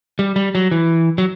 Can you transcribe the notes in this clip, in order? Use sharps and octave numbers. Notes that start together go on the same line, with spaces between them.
G3
G3
F#3
E3
F#3